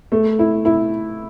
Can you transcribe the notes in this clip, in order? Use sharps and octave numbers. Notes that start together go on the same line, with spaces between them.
A3
E4
E4